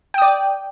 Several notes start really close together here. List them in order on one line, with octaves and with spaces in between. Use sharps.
G5 D#6 D5